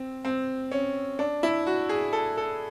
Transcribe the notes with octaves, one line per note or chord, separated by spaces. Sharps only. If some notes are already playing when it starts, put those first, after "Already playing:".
Already playing: C4
C4
C#4
D4
E4
F#4
G#4
A4
A4